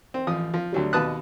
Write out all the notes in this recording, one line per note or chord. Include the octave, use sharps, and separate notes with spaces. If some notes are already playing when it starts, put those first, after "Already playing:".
C4
A1 F3 D#6
F3
D2 F#3 G3
D#2 B2 B4 A5 D#6 F#6